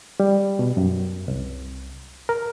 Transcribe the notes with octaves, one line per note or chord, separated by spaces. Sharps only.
G3
B2
F#2
C2
A#4